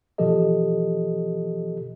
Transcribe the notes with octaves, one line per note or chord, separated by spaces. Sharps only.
B2 E3 F3 G4 A4 D#5